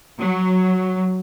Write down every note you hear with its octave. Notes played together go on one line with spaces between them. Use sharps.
F#3